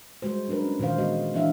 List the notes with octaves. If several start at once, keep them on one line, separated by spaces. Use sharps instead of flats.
G3 G#3 F#4 C5
F#3 D4 F#4 A#4 B4
C#4
A#2 D#3 E3 C5 F5
G#3 B3 F#4 D#5
E3 A#3 D4 E5 F5